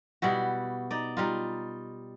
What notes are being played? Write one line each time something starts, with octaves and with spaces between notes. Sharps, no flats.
B2 G3 E4 F#4
D#4 D5
G3 D#4 F4